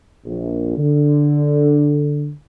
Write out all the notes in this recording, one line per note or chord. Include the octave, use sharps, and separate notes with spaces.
A#1
D3